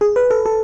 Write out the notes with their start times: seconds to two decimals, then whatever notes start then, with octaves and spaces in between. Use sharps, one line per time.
0.01 G#4
0.16 B4
0.30 A4
0.46 A4